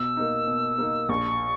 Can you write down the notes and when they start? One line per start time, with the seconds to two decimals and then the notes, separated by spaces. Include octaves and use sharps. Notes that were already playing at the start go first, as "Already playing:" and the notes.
Already playing: B2 E6
0.17 A#3 D#4
0.47 B2
0.78 A#3 D#4
1.09 A#1 C#6